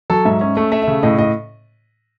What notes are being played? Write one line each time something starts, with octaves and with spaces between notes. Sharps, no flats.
F#3 A4
G#2 E5
C#4
A3
A3 E5
E5
C#3
A2 D#5
A2 D#5